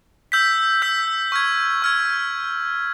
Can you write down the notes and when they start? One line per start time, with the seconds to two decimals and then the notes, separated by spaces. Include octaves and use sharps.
0.32 E6 G6 B6
0.82 E6 G6 B6
1.32 C#6 F6 G#6
1.82 C#6 F6 G#6